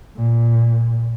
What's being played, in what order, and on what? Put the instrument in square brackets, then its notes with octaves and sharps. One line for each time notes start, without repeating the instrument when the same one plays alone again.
[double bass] A#2